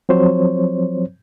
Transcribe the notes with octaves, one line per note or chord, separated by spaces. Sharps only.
F3 F#3 C4 C5 C#5